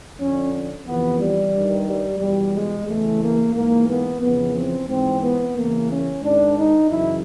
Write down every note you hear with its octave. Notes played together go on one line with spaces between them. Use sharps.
F2 D3 C#4
F2 C3 E3 B3
G3
G2 D#3
G3
E2 B2 G3
G#3
E2 C#3 E3 A3
A#3
G#2 E3 A#3
B3
F2 C#3 E3 B3
C4
G#2 E3 C4
B3
E2 C#3 E3 A#3
C#4
G#2 D#3 D4
D#4
F#2 C#3 E3 E4